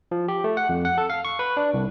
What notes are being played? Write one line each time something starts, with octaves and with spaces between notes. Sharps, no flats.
F3
G4
A3
F#5
F2
F#5
A4
F5
C#6
B4
D4
C2